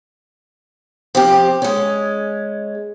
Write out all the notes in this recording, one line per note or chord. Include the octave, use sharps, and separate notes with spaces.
F3 C4 G4
G#3 C#4